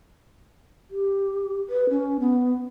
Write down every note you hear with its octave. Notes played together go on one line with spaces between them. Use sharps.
G4
B4
C#4
B3